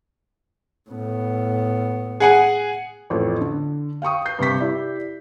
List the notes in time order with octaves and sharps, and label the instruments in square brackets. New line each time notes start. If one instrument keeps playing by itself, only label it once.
[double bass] A2 B3
[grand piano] G#4 F#5 G#5
[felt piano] A1 F2 A4
D3
F5 G5 C#6 D#6
G6 C7
G2 C3 C#6 B6
E4 G4 D5